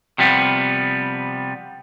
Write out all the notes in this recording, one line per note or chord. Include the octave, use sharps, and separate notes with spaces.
C3 F3 G3 B3